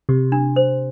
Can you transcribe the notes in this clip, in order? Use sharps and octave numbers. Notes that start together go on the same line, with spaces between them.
C3 G4
D4
C5